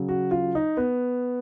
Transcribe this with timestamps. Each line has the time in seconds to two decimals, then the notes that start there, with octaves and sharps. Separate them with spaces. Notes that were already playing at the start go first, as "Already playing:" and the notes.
Already playing: C#3 F#3
0.09 F#4
0.31 F4
0.55 D#4
0.77 B3